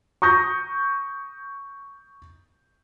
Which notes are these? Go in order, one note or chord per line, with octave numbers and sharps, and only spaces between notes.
C#6 D#6 G6 A#6